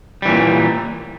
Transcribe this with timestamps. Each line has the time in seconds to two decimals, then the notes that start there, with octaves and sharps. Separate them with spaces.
0.22 G3
0.25 E3
0.29 A#2